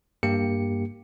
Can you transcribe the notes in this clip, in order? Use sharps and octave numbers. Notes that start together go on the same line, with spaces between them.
G2 A#3 G4 C#7